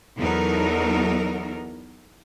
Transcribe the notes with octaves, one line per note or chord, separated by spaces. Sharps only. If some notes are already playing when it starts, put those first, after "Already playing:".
E2 F#3 B3 D#4 A4 A#4